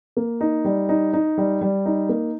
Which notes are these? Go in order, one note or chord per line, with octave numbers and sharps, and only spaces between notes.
A#3
D#4
G3
D#4
D#4
G3
G3
D#4
A#3